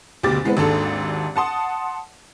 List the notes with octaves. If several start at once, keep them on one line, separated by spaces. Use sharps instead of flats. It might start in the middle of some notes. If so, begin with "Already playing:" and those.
F#1 D2 B2 G4 D6 A6
E3 G#3 B3 C4 B4
G#1 D#2 G#2 D4 A4
F#5 A5 C6 D#6